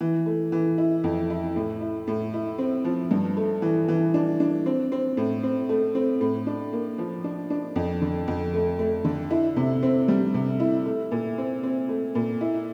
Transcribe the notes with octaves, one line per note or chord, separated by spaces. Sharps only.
E3
A3
E3
E4
F2
E4
A2
E4
A2
E4
C4
F3
G2
A3
E3
E3
D4
D4
C4
C4
A2
C4
A3
C4
A2
D4
A#3
F3
D4
D4
F2
D3
F2
A3
A3
D3
E4
C3
C4
G3
C3
E4
A3
A#2
C4
C4
A3
A#2
E4